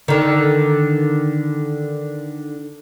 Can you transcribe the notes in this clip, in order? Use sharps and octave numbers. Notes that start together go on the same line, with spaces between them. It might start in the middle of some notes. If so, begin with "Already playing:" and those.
D3 D#3